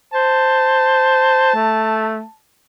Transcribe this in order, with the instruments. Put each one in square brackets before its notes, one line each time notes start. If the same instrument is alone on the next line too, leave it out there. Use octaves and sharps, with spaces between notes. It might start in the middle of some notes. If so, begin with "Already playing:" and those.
[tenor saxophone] C5 [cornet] A5
[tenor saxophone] A3